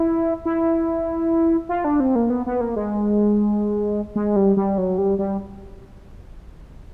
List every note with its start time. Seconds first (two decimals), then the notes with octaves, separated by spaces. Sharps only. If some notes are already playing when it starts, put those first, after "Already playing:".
Already playing: E4
0.45 E4
1.69 F4
1.84 D4
2.00 C4
2.16 A#3
2.30 B3
2.46 B3
2.61 A#3
2.76 G#3
4.15 G#3
4.36 G3
4.57 G3
4.78 F#3
4.98 G3
5.19 G3